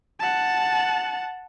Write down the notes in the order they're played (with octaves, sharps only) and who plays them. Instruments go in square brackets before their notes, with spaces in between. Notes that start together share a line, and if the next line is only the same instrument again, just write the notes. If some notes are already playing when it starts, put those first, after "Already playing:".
[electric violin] F#5 A5